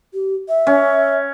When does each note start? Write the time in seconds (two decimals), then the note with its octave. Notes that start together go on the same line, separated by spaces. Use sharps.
0.14 G4
0.49 E5
0.67 C#4